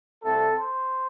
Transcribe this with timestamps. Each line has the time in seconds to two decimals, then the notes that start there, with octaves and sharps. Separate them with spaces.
0.23 C2 C3 A3 C4 A4
0.58 C5